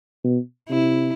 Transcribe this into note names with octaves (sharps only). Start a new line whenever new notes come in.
B2
C3 E4